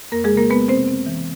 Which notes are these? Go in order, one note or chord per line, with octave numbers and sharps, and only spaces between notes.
F2 A#3 A#4
G#3 G#4
C#3
A#3 A#4
G#3 B3 B4
C3 C4 C5
C4
E3